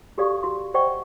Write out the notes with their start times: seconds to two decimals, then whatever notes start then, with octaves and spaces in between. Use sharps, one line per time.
0.18 F#4 G4 A4 D5 F5 C#6
0.43 F#4 C6
0.74 C5 D5 D#5 F#5 G5 C#6